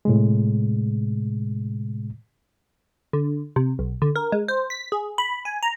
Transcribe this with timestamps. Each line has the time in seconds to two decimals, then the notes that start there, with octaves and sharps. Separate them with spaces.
0.05 A2 C3 G#3
3.13 D3
3.56 C3
3.79 B1
4.02 D3
4.16 A#4
4.32 G#3
4.48 C5
4.70 B6
4.92 G#4
5.18 B5
5.45 G#5
5.63 A#5